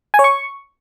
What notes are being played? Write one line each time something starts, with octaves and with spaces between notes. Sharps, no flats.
G#5
C#5
C#6